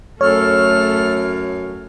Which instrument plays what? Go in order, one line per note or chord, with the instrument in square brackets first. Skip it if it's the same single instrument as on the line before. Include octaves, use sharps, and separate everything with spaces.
[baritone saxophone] F#2 [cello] A3 [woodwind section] A4 F6 [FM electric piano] C#5